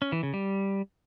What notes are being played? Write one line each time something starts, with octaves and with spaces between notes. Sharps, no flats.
C#4
E3
C#3
G3